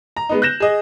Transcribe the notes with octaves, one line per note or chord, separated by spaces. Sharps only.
A#5
G#3 B3 D#4
F#6 G6 A#6 E7
G#4 D#5